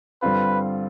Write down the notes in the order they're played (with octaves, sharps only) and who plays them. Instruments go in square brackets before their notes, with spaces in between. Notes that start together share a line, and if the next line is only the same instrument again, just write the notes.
[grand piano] G2 D3 G3 C4 F4 [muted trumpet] B4